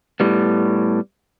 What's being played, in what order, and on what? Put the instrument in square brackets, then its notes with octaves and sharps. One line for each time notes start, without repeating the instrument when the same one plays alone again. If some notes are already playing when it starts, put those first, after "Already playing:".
[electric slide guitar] A2 G3 B3